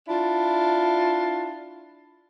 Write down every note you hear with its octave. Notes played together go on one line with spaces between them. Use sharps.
D4 E4 F4